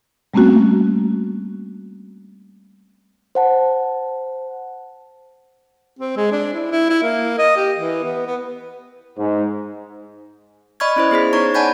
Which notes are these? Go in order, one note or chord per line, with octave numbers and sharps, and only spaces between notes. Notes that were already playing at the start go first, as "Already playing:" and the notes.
G3 A3 A#3 C4 C#4 F#4
C5 F#5 A5
C4
G#3
D4
E4
E4
E4
A#3
D#5
G4
E3
B3
B3
G#2
D5 D#5 B5 C#6 F6 G#6
C#4 E4 C5
B3 G#4 C5 B6
D#4 C#5 A#5 C#6 G#6
D5 F#5 G#5 A5 B5 G6